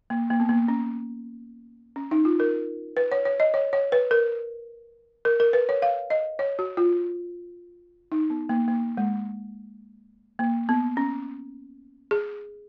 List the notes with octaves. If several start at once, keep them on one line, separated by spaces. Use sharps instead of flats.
A#3
A#3
B3
A#3
C#4
C#4
D#4
F4
A#4
B4
C#5
C#5
D#5
C#5
C#5
B4
A#4
A#4
A#4
B4
C#5
F5
D#5
C#5
F#4
F4
D#4
B3
A#3
A#3
G#3
A#3
B3
C#4
G#4